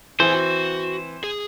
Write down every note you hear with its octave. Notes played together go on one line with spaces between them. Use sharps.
E3 C4 G#4 C5 F#5 G#5
F#4
G#4